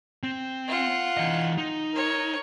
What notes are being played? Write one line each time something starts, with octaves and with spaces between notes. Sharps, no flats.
C4
F4 F#5
E3 D#5
D#4
A#4 C#5